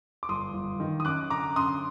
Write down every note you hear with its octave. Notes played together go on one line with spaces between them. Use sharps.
D6
G1 C6 D#6
G1
D#3
D#6
F#2 D6 F#6
D3 A#5 D6
F#2 C6 D#6